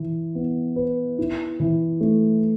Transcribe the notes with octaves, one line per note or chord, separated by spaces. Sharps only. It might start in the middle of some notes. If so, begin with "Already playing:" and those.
Already playing: E3 E4
B3
B4
E4
E3
A3